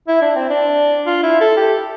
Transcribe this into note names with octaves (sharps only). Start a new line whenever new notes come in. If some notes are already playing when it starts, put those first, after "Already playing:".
E4
D4
C4
D4
F4
E4
A4
G4